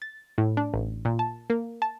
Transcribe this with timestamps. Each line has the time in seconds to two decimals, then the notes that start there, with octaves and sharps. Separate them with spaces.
0.02 A6
0.38 A2
0.57 D4
0.74 A1
1.05 A#2
1.19 A5
1.50 A#3
1.82 A5